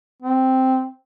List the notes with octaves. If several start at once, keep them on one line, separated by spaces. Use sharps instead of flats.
C4